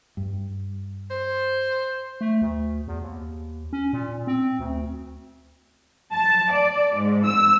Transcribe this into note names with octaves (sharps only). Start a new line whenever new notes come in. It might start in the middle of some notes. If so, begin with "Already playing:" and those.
G2
C5
A3
D2
E2
D#2
C#4
A#2
C4
D2
A5
D5
G#2
E6